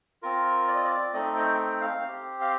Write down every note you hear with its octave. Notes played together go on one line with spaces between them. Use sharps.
C4 F4 A#4
D5
D#5
D5
A3 C4 D#4 D#5
G5
G5
F5
C4 G4
F5